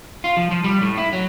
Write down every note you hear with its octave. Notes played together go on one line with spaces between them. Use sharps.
F4
F3
F3
G3
A2
E4
F#3